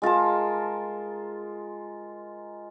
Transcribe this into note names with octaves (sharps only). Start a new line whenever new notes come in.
G#3 F4 A#4 A5